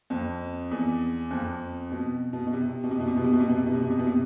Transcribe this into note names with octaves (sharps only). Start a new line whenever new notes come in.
F2
E2
F2
B2
B2
B2
C3
B2
C3
B2
C3
B2
C3
B2
C3
B2
C3
B2
C3
B2
C3
B2
C3